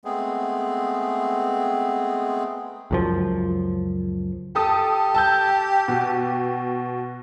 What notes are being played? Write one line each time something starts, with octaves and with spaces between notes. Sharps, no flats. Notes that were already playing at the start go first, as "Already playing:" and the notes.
G#3 A3 B3 C4 G#4
C#2 F#2 F3
G4 A4 A5 D#6
A5 E6 G6
B2